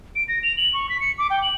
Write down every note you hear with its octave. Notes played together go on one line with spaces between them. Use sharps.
D7
A#6
F7
F#7
C#6
B6
C#7
D6
G5
F#7